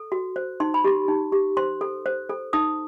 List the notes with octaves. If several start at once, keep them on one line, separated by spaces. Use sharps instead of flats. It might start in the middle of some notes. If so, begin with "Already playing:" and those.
Already playing: A4
F#4
C5
D#4 C6
B5
G4 C6
D#4
G4
C5 C6
A4
C5
A4
D#4 D#6